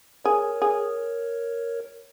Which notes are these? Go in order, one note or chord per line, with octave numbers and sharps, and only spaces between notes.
G#4 A#4 C#5
G#4